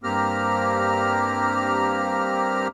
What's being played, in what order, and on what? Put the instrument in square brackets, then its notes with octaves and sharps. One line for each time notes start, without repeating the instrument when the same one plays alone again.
[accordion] G2 A#3 C4 G4 A#5 F6